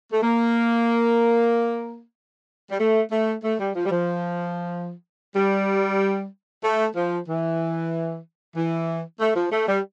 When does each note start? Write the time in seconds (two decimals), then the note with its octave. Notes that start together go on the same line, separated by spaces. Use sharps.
0.12 A3
0.23 A#3
2.71 G3
2.79 A3
3.12 A3
3.43 A3
3.60 G3
3.75 F3
3.86 G3
3.91 F3
5.35 G3
6.64 A3
6.96 F3
7.28 E3
8.56 E3
9.20 A3
9.36 F3
9.52 A3
9.68 G3